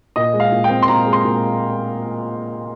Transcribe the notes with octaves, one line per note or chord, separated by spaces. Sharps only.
A#2 D#5
G#3
F5
A#2
G5
C4
C6
A#2 A#5
G#3
C6
A#2